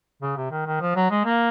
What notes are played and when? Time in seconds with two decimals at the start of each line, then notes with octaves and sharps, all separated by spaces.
0.22 C#3
0.37 C3
0.51 D#3
0.67 D#3
0.81 F3
0.96 F#3
1.10 G#3
1.25 A#3